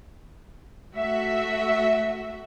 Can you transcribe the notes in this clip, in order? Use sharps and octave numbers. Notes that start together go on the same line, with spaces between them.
A3 F#4 E5